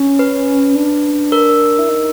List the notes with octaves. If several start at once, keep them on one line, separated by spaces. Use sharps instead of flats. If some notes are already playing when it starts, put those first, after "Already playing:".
Already playing: C#4
B4
D4
A#4
E4
D#4